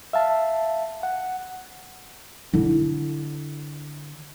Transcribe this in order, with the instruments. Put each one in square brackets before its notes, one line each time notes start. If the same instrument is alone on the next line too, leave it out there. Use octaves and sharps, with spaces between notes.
[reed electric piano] E5 F5 A5
F#5
[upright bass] D3 E4